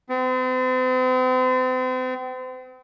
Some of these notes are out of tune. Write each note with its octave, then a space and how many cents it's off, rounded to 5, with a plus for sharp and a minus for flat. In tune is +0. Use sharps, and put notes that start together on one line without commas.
C4 -40